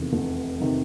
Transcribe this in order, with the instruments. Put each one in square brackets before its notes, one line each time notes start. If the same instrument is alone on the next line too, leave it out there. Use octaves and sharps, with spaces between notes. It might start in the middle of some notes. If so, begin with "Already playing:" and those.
Already playing: [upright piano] F1 E2 C3 D#3
F1
C3 D#3